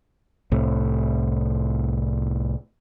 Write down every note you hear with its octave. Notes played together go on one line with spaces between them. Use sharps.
C2 A2